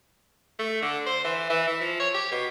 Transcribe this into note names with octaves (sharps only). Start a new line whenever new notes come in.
A3
D3
C5
E3
E3
E3
F3
C#5
G4
B2